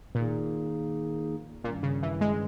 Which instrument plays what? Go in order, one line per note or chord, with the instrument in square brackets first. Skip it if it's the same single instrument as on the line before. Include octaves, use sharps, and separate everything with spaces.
[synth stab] A#2 [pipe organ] D#3 A#3 D#4 G#4
[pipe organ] G2 D#3 G3 C#4 [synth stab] A#2
[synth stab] C#3
E3
G#3